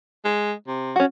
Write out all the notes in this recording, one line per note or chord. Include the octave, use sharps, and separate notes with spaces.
G#3
C3
C#4 F#4